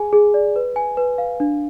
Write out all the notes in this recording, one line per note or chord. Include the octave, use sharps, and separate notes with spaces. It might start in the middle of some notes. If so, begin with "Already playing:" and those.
Already playing: G#4 G#5
G#4
D5
B4
G#5
B4
F5
D4